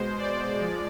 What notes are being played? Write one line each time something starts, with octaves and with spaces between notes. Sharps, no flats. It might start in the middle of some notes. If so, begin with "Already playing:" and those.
Already playing: B2 G#3 C5
D5
F3 G#3